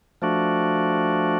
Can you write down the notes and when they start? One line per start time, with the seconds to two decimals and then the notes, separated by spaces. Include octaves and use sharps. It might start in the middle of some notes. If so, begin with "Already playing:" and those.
0.22 F3 A3 D4 F#4